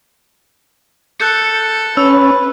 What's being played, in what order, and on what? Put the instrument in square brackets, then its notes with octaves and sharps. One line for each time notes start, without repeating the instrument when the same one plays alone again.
[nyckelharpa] A4 [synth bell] F#6 G6 C#7
[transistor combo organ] C#4 [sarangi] B4 [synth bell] E6